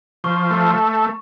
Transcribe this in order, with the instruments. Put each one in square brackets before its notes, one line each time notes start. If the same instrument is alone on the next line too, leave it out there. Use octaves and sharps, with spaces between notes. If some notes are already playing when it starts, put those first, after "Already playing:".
[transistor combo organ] F3 [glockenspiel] C#6
[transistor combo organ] A3